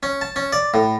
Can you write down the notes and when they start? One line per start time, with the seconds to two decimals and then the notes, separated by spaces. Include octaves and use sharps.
0.03 C#4
0.21 A5
0.36 C#4
0.53 D5
0.74 A2